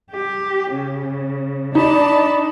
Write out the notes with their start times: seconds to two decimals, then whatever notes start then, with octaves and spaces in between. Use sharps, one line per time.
0.11 G4
0.73 C#3
1.75 D4 D#4 A5 B5